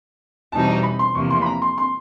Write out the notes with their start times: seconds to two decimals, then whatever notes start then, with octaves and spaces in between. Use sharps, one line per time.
0.52 E2 B2 G3 C4 D#4 A5
0.68 A#5
0.83 B5
0.99 C6
1.15 E2 C3 F3 A#3 C#6
1.31 C6
1.42 B5
1.46 A#5
1.62 C6
1.78 C6